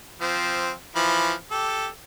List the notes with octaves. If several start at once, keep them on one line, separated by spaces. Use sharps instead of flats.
F3 C4
E3 F3 B5
G4 A4